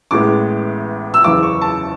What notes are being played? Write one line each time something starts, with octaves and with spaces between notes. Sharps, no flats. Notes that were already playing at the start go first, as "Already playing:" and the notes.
A1 A2 G#3 B3 D6
E6
F#1 E2 C#3 E3 D6
C#6
A5